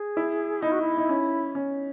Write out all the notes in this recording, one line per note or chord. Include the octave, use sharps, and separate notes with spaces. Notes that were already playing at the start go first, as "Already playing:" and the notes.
Already playing: G#4
E4
D#4 E4
F#4
E4
D#4
C#4
C#4